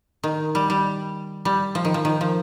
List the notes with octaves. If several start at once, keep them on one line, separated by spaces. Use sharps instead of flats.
D#3
G3
G3
G3
F3
D#3
F3
D#3
F3